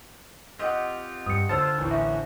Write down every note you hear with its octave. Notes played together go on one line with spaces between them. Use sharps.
C4 F4 G4 D#5 F#5
G2 D#6 C#7
D3 F4 C5 A5 E6 A6
A1 A2
C#4 F#4 E5